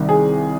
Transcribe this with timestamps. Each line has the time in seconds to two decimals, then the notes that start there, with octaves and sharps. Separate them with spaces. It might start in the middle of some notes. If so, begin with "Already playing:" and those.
Already playing: C2 C3 D#3 G3
0.09 G#4